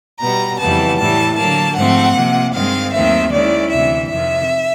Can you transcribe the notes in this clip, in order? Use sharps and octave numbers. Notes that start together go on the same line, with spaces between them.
B2 G3 B3 A#5
F2 C#3 E3 G3 B3 A5
A2 E3 G3 A5
D3 F#3 A#3 A5
G#2 F3 A3 C4 F#5
C3 F3 A#3
G2 D#3 G#3 C4 F5
D#2 D#3 F#3 A3 C4 E5
D#3 G#3 C#4 E4 D5
D2 C3 E3 E5
F2 C3 D#3 E5